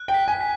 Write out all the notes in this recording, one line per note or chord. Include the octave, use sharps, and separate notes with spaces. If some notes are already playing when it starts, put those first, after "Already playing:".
Already playing: F#6
G5
B6
G#5
B6